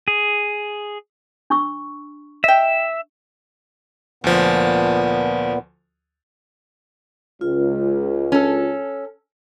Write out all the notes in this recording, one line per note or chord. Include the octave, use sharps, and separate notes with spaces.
G#4
D4 C#6 E6
D#5 E5 G5
D2 A#2 F3 B3
C#2 F4
C#4 A4